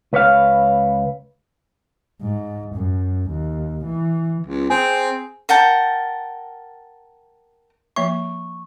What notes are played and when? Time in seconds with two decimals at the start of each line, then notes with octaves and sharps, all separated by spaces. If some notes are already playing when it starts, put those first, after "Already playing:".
0.13 C#2 B4 C#5 F5
2.22 G#2
2.75 F#2
3.30 D#2
3.85 E3
4.46 C#2
4.70 C4 G#4
5.49 A#4 F#5 G5 A5
7.96 F3 A#3 E5 C#6